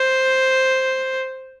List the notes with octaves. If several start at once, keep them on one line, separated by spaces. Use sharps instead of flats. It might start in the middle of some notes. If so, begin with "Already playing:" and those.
Already playing: C5